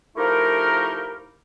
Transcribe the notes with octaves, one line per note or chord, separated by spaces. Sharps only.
F3 A3 D#4 E4 G4 A#4